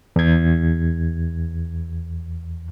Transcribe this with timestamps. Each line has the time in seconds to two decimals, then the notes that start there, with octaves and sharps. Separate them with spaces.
0.16 E2 G#6